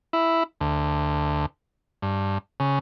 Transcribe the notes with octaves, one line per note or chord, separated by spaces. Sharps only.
E4
D2
G2
C#3